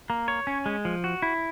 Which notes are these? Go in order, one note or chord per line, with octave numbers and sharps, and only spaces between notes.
A#3
C#5
C#4
G#3
F3
F#4
E4